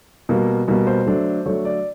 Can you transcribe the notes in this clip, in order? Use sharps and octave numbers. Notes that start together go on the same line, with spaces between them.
B2 G3 A#3
B2 G3 A#3
C5
D3 F#3 A3 D4
D3 F#3 A3 D4 C#5
D5